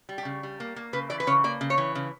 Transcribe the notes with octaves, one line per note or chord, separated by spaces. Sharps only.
G3
G4
C#3
G3
A#3
A#3
C#3 B4
E3 D5
B4
C#3 C#5
A#3 D5
C#3
C#5
E3
C#3